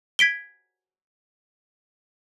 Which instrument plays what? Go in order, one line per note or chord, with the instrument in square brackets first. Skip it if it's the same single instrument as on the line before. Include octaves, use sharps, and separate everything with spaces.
[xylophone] G#6 B6 D7 G7